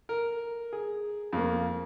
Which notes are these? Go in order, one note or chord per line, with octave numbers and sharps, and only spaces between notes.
A#4
G#4
F2 A#3